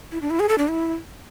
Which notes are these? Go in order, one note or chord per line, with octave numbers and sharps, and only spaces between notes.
E4
D4
E4
G#4
A4
D4
E4